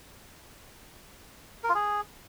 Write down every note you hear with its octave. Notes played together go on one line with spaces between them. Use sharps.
A#4
F4
G#4